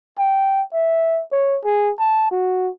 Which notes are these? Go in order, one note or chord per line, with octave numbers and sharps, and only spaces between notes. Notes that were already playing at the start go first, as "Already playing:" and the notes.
G5
E5
C#5
G#4
A5
F#4